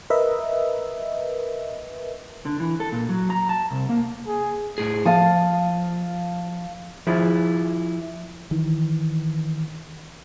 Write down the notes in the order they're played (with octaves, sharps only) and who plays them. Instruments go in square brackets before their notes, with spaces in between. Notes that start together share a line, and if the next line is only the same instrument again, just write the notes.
[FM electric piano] A#4 B4 D#5 E5
[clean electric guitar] D3
E3
A4
A#2
F#3
A#5
A5
C2
A#3
[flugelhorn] G#4
[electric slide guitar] A2 G#4
[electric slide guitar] F3 [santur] F5 A5 D#6
[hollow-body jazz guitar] F3 E4 F4 G#4
[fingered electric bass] D#3 E3